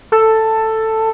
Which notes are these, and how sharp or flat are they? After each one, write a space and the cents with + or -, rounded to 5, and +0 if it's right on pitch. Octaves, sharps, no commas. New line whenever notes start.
A4 +10